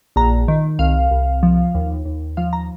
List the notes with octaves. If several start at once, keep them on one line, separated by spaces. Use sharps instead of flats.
A#1 A#5
D#3
C2 F5
C2
F3
D#2
D#2
F3 F5
A#5